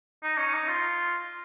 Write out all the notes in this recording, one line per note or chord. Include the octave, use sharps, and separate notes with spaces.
D#4
C#4
D#4
F4